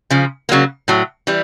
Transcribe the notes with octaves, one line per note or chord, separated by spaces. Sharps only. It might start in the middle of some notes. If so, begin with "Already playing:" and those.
C#3 F3
C#3 F#3 A#3
A2 F#3
E3 G3